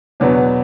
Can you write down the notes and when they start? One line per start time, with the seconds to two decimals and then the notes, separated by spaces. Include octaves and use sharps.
0.20 E2 B2 F#3 B3 D4